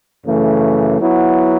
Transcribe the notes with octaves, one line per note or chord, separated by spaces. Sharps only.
F#2 C#3 E3 A3
F#3 B3 E4